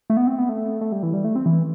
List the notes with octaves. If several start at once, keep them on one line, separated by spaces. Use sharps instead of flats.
A3
B3
C4
B3
A3
A3
G3
E3
G3
A3
C4
E3